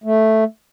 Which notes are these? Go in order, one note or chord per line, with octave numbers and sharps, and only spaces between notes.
A3